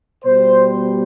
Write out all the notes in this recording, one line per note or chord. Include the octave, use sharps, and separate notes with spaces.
B2 G3 C5